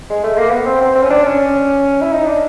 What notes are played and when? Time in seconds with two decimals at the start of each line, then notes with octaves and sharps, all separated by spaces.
0.10 G#3
0.24 A3
0.37 A#3
0.51 B3
0.65 C4
0.81 C4
0.95 C4
1.02 C#4
1.10 D4
1.25 C#4
2.02 E4
2.12 D#4
2.27 D4